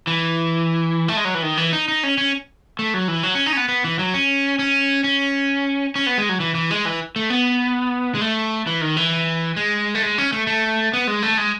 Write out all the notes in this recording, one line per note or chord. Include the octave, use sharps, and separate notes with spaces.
E3
A3
G#3
F#3
E3
D#3
E3
D#4
D#4
C#4
C#4
A3
F#3
E3
F#3
C#4
D#4
C#4
B3
B3
E3
F#3
C#4
C#4
C#4
C#4
B3
G#3
F#3
E3
E3
G#3
E3
A3
B3
G#3
A3
E3
D#3
E3
G#3
A3
G#3
C#4
A3
A3
B3
G#3
A3
G#3